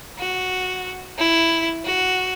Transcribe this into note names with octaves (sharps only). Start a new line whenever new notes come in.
F#4
E4
F#4